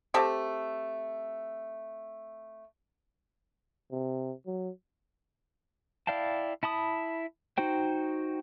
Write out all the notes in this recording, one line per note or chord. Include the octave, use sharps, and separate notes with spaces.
A3 C4 G4 A4
C3
F#3
E4 D5 F5 G5 A5
E4 A5 B5 D#6
D#4 F#4 C5 G5